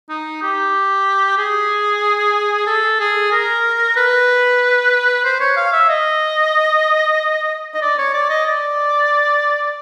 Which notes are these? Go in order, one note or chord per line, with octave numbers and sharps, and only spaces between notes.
D#4
G4
G#4
A4
G#4
A#4
B4
C5
C#5
F5
E5
D#5
D#5
D5
C#5
D5
D#5
D5